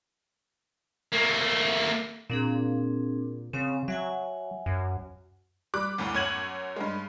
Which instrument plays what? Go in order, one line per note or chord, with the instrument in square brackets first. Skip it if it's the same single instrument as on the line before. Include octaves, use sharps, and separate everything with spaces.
[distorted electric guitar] A3 A#3
[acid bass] A#2 [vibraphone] C4 D4 G#4
[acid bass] C#3 [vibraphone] C4 F5
[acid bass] F#3 [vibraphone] E5 F#5 G#5
[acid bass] F#2
[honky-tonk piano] G3 D6 F#6
G1 D2 A2
F#2 C#5 G#6 D#7 F#7
G2 G#3